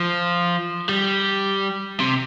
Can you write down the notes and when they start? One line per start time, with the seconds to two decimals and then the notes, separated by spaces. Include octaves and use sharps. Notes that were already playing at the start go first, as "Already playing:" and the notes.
Already playing: F3
0.89 G3
2.00 C3